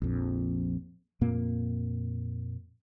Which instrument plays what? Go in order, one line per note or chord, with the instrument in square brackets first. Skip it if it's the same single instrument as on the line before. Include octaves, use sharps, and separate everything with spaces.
[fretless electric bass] A#1 F2
F2 A#2 A#3